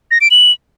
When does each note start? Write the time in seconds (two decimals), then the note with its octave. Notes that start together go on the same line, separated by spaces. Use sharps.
0.11 A#6
0.21 D7
0.31 F#7